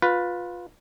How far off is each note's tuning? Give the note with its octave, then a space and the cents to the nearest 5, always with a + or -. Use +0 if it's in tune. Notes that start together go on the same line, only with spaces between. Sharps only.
F4 +20 B4 +0